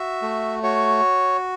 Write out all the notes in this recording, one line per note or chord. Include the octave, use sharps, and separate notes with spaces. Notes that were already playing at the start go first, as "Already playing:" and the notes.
Already playing: F#4 E5
A3
F#4 C#5